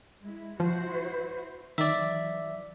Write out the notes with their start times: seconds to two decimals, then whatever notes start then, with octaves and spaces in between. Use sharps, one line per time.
0.23 G#3 E4
0.60 F3 E4 F#4 C5
1.78 D#3 E3 F#3 D5 E5